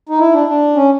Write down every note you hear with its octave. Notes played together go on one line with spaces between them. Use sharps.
D#4
E4
D4
D4
C#4